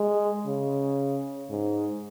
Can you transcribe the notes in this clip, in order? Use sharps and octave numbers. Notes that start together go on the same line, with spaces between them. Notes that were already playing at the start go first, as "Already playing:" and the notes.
Already playing: G#3
C#3
G#2